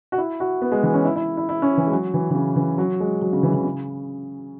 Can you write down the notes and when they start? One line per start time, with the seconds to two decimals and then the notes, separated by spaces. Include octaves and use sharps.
0.12 F#4
0.18 E4
0.40 F#4
0.62 B3
0.72 G#3
0.83 E3
0.94 C#4
1.05 E4
1.16 E4
1.37 E4
1.49 E4
1.62 C#4
1.77 E3
1.87 G#3
1.91 F#3
2.14 E3
2.31 E3
2.35 C#3
2.56 E3
2.78 F#3
3.00 G#3
3.22 F#3
3.33 C#3
3.43 E3
3.54 E3
3.64 C#3